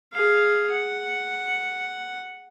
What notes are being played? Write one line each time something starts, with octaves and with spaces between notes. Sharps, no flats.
G#4 F5
F#5